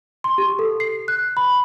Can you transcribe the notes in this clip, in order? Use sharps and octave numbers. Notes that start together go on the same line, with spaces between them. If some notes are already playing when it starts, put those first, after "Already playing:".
C6
G4
A4
C7
F#6
B5